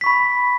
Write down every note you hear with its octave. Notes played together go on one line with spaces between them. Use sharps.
B5 C#6 B6